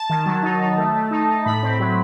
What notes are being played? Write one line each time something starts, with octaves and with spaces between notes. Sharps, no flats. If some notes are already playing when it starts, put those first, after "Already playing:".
Already playing: A5
D#3
F#3
D#4
D#4
A3
A3
D#4
D#4
A2 B5
C4
F#3